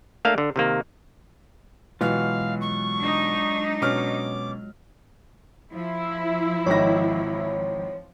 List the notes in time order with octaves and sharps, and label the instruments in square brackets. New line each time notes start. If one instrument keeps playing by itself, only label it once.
[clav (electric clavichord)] A3 A#3 D4 F5
D3
C3 D#3 A#3
[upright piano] B2 E3 [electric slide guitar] F#3 G#3 F4 [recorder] F5
[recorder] C#6
[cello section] D4 D#4
[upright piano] B2 C#4 F6 [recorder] D6
[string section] F3 [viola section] E4
[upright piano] G#1 D#3 A#6 [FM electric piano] C#5